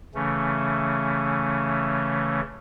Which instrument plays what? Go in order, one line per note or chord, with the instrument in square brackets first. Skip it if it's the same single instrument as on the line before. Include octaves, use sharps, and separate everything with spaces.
[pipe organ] C#3 E3 A3 C#4